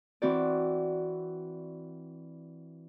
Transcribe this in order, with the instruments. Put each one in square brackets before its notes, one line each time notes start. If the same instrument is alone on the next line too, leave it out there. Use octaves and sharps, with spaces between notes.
[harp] E3 C4 F#4 D5